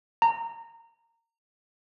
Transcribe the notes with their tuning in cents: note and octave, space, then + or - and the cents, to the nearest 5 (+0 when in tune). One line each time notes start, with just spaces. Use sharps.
A#5 -20